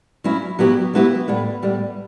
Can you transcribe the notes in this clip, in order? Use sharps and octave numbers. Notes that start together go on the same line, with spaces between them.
F#3 C#4 E4
F#3 B3 E4 G4
F#3 B3 E4 G4
A2 G3 B3
A2 G3 B3